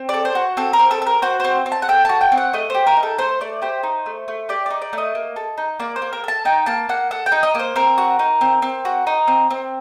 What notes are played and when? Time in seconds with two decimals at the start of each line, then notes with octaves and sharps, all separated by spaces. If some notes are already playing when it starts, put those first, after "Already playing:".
Already playing: C4
0.09 A4 D5
0.25 C5
0.35 F#4
0.57 C4 A4
0.73 A#4
0.79 C4
0.91 A4
1.02 A4
1.07 A#4
1.22 F#4 C5
1.40 C4 C5
1.66 C4
1.72 A5
1.82 F#5
1.89 A4 G5
2.05 F#4 A5
2.21 G5
2.32 C4
2.37 F#5
2.53 A3 D#5
2.70 G4 C5
2.87 A#4
2.97 D#4
3.03 A4
3.18 A3 C5
3.41 A3 D5
3.62 G4 C5
3.83 D#4
4.06 A3
4.28 A3
4.49 G4 D5
4.66 D#4 D5
4.82 D5
4.93 A3 D#5
5.15 A#3
5.36 A4
5.58 D#4
5.80 A#3 D5
5.96 C5
6.02 A#3
6.13 A#4
6.24 A4 A5
6.45 D#4 G5
6.66 A#3 A5
6.89 A#3 F#5
7.11 A4 F#5
7.26 G5
7.32 D#4
7.43 D#5
7.55 A#3 C5
7.76 C4 A#4
7.98 F#4
8.19 D#4
8.41 C4
8.62 C4
8.85 F#4
9.07 D#4
9.28 C4
9.50 C4